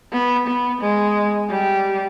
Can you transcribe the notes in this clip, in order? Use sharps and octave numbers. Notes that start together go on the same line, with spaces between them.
B3
B3
G#3
G3